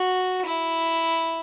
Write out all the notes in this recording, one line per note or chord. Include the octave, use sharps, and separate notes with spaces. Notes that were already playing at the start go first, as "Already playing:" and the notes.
Already playing: F#4
E4